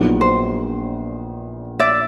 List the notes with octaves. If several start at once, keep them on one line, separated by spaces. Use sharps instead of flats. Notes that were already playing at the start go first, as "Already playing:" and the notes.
Already playing: A#1 A#2 F#3 B3 D#4
C5
D5 E5